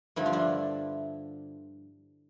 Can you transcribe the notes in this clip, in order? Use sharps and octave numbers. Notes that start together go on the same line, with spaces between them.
G2 D3 F3 E4
F4
D4 E4